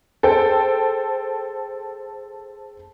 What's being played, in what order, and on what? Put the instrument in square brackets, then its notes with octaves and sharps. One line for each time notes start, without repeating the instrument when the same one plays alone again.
[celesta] G#4 A5 [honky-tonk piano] A4 C5 G5